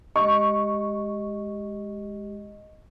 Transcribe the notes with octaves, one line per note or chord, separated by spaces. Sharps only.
G#3 G4 D#5 C#6